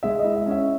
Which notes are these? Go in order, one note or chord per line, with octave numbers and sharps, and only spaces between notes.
G#3 E5
D#5
E4
E5
C#4
E5